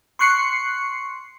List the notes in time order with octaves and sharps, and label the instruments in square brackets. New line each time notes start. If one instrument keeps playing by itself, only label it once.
[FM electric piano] C6 C#6 F#6 C7 C#7